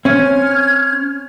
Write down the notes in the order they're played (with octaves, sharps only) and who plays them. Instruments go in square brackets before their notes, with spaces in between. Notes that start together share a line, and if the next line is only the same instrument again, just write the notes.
[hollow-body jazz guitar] C4 C#4 [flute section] F6 G#6